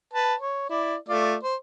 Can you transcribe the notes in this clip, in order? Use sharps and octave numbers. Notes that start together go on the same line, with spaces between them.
B4 A5
C#5
E4 D5
A3 F4 D5
C5